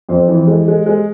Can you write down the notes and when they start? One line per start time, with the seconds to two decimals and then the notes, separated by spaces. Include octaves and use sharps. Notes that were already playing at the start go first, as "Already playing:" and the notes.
0.09 F2 C5
0.28 E3
0.47 G#3
0.68 G#3
0.86 G#3